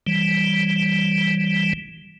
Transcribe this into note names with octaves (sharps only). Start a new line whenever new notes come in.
E3 G3